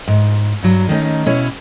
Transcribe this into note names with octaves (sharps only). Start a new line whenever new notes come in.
G#2
G2 F#3
D#3 A3 C#4 D#4
B2 C#4 E4 C#5